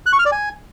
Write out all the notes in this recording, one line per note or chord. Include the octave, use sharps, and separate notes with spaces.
F#6
C#6
F6
D5
G#5